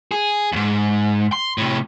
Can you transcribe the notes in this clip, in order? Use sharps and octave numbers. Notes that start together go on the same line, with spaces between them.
G#4
D#2 G#2
C6
A2 C3